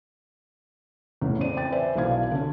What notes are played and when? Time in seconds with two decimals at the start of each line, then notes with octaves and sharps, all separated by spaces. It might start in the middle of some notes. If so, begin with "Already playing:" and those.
1.21 E2 A2 C#3
1.40 C4 C5 D5 D#7
1.57 G5 A6
1.72 B4 C5 D5 E5 G#5
1.96 B1 E3 F5 G#6
2.31 D3 C#4